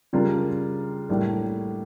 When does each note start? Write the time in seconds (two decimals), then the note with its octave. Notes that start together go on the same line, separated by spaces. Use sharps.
0.13 C#3 G3 D4 F4 A#4
1.09 A2 G3 A#3 D4